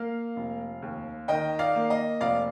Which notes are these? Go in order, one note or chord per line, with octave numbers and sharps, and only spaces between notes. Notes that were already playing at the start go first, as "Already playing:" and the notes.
Already playing: A#3 F5
F1
D#2
D#3 D#5 G5
D5 F5
A#3
D#5
F1 D5 F5